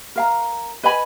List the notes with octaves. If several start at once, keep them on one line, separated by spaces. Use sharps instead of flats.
A#4 F5 A#5
B4 D#5 G#5 B5